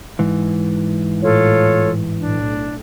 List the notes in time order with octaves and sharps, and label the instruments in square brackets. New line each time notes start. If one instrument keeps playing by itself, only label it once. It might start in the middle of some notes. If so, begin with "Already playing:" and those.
[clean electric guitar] G#2 E3
[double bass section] A2 [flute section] F4 A4 C#5
[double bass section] B1 A2 [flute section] D4